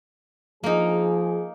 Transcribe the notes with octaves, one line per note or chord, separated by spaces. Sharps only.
F3 A#3 D#4 G#4